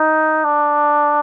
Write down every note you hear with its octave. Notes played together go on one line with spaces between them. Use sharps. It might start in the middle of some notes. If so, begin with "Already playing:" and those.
Already playing: D#4
D4